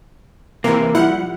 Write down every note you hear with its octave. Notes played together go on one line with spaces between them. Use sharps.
C3 E3 A#3
F3 G3 E4 F#5